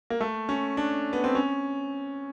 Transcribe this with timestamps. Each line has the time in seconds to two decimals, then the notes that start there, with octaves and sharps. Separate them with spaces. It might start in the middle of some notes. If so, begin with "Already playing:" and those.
0.10 A#3
0.21 A3
0.49 C#4
0.77 D4
1.13 B3
1.24 C4
1.35 C#4